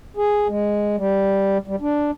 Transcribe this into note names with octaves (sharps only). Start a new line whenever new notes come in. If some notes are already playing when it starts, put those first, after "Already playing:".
G#4
G#3
G3
G3
D4